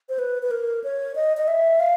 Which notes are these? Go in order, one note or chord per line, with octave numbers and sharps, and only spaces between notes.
C5
B4
B4
A#4
C#5
D#5
D#5
E5
F5